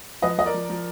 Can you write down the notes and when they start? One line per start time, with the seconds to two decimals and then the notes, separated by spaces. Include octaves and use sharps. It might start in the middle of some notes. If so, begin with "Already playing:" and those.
0.22 F3 B4 D#5
0.38 F3 D#5
0.46 A#4 D5
0.54 F3
0.70 F3